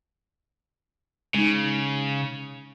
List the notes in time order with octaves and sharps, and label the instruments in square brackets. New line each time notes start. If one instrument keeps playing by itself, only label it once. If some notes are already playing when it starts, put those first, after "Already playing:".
[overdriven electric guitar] C#3 [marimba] G#3 D#4